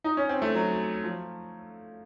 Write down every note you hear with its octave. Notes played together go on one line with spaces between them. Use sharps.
D#4
C#4
C4
A3
F#3
F3